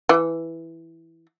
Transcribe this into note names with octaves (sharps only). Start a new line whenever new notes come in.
E3